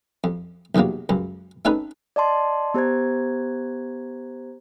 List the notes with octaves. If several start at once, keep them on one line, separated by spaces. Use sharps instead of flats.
F2
B1 E2 C3 F#3 A#3
C#2 F#2
A3 C4 C#4 D#4 A4 B4
D5 D#5 A5 C6
B3 G4 C5 A#5 G#6